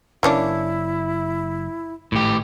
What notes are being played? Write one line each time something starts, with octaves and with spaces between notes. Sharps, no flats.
F#1 A#3 C#4 D4 E4
G#1 A2 G4